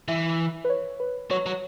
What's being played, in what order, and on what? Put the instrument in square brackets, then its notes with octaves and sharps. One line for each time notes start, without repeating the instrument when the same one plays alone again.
[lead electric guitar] E3 [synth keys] E5
[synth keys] B4
C#5
B4
[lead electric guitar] F#3 [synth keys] C#5
[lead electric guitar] F#3